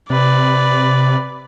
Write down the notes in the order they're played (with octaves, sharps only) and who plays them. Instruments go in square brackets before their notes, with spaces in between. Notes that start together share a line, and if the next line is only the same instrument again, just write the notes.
[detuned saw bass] C3 [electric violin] B4 D5